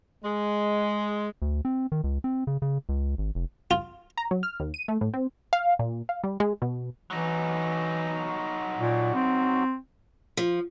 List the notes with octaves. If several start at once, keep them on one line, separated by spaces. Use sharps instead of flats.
G#3
D2
C4
D#3
C#2
C4
C#3
C#3
C#2
G#1
F1
F4
A#5
F#3
F6
D#2
D#7
A3
A2
C4
F5
A#2
F5
G3
G#3
B2
E3 F#3 D#4
A#2
C4
F3